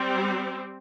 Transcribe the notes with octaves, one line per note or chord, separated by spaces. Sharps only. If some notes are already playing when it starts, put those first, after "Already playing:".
Already playing: G3 C4